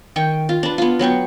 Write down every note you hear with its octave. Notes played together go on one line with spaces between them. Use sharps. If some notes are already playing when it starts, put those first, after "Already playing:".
D#3 G5 C#6
F4
D4 B4
B3 F4
F#3 B3 G5 C#6